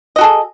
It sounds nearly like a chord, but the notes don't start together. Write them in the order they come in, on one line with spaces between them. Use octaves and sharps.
D#5 F#4 A4 G#4